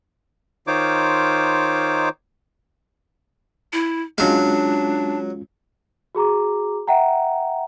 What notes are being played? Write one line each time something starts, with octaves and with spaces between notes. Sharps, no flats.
D#3 D#4 F4 C5 C#5 D6
E4
F#3 G#3 C#4 D4 F4 F5
F#4 G#4 A#5 D6
E5 F#5 G5 A#5